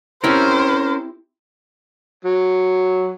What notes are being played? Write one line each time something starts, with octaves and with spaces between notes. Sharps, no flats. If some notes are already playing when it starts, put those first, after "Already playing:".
C4 C#4 E4 G4 A#4 C5
F#3